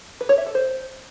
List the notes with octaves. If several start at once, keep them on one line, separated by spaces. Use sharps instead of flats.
B4
C#5
E5
A4
C5